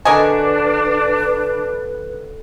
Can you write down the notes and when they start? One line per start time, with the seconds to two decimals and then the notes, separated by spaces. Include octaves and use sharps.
0.05 D3 D4 F#4 A#4 B4 D#5 G#5